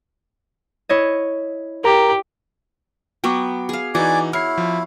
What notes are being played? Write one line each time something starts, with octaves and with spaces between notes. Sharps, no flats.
E4 C#5 D#5
G4 A#4 A#5
F#3 B3 G5 C#6 D6
G#4 F5
E3 D#4 F#4 D5 G#5 D6
E4 C#5 F6 C7
F3